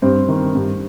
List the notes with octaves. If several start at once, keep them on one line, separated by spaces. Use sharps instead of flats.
G2 C4
D#3
G2